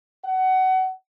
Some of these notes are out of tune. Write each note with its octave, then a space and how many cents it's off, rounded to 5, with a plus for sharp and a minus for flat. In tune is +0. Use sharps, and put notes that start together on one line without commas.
F#5 +25